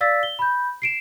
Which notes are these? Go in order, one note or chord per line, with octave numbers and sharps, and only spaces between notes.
D5 F5 E6 A6 B6
G7
B5 G6
C7 D7 E7